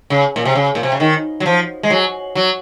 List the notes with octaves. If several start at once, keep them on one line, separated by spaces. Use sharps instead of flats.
C#3
A#2
C3
C#3
A#2
C3
C#3
D#3
F#3
F3
G#3
F#3
F#3